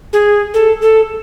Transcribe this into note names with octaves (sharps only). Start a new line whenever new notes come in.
G#4
A4
A4